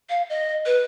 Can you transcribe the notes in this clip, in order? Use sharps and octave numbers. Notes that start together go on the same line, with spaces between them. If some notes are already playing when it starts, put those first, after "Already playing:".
F5
D#5
B4